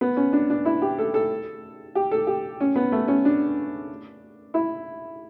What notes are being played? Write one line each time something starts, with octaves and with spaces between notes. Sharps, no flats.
B3
C#4
D4
D4
E4
G4
A4
A4
G4
A4
G4
C#4
B3
A3
C#4
D4
E4